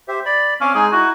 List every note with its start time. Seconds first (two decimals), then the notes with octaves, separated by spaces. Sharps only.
0.08 G4 C5 E5
0.26 D5 B5
0.61 C4 C#4 F5 D6
0.75 G#3 D#4 G#4 G#5
0.92 D#4 E4 F#4